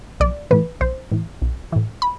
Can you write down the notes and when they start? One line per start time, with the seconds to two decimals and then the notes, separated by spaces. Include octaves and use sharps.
0.20 B1 D5
0.51 A2 E3 B4
0.81 B1 C5
1.11 A2 E3
1.42 B1
1.72 A2 E3
2.02 B5